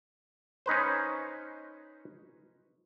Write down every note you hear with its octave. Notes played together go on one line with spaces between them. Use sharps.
C#4 D#4 B4 C5